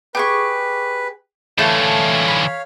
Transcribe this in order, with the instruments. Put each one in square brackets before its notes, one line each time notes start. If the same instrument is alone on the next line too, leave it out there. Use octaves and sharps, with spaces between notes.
[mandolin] G4 G#4 C#6 [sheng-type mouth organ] B4
[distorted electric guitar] D3 E3 [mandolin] A3 G5 A5 [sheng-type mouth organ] C#5 F5
[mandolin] B5